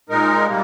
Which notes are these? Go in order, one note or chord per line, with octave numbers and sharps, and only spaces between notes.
A#2 G#3 D#4 A#4
C3 G3 A#3